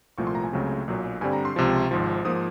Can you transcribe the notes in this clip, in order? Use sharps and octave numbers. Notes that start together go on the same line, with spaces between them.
C2 A#2 F3 A3 C#6
C6
A#5
G#5
C#2 C#3 F#3 A3 C4
B1 A#2 F#3
G2 D3 G3 C4 G#5
A#5
C6
C#2 C3 F3
G#1 G#2 F3
G#2 F3 A#3 D#6